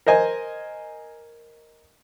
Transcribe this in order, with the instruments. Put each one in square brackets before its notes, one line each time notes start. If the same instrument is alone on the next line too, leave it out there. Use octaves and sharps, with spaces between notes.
[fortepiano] A#4 C5 D#5 G#5